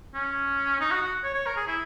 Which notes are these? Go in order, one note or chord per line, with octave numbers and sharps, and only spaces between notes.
C#4
D#4
F#4
F#4
C#5
C#5
A#4
G#4
E4